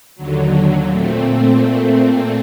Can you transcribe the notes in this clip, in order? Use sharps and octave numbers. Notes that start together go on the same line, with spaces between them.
D#2 D3 F#3
A#2 A3 C4